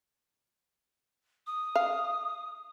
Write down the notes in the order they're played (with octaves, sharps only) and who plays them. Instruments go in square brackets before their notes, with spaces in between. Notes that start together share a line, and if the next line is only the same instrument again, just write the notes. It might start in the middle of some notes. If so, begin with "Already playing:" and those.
[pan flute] D#6
[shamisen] F5